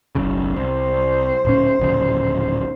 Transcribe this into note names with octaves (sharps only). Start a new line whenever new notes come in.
F#1 B1 C#3
C2 C5
D1 A#2 C#4
D1 A#1 C#3